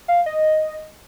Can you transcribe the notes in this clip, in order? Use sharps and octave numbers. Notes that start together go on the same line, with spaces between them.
F5
D#5